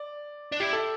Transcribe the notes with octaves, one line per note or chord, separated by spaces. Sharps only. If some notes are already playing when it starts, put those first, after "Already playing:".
Already playing: D5
D4
E4 G4
A4